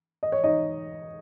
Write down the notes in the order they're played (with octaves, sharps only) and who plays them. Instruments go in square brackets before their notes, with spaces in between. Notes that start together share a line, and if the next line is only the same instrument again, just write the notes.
[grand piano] D#5
C#5
D#4 D#5